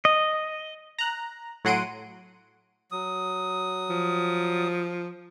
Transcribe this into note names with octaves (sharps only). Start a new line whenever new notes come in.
D#5
A#5 F#6
A2 F#3 F#5 C6 D7 D#7
F#3 D#6
F3